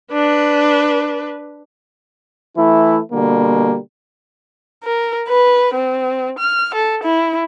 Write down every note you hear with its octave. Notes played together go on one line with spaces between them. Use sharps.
D4 B4
E3 A3 E4
B2 D3 G3 A#3
A#4
B4
C4
F6
A4
E4